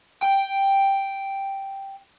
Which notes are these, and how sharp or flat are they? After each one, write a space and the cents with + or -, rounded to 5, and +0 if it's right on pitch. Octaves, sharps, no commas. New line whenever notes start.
G5 +0